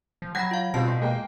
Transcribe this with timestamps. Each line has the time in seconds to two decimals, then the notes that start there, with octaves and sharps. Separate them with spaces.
0.22 F3
0.35 F#3 F#5 G5 B5 G#6 A#6
0.51 F4 F5
0.74 B2 G3 C4 F4 A5
0.87 A2
1.02 G#3 A#3 G5